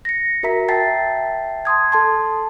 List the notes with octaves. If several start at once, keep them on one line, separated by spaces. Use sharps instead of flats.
A#6 C#7
F#4 A#4 E5 A#5 B6
E5 G5 A5 A6 B6 C7
A5 C6 D#6 G#6
A4 A5 C6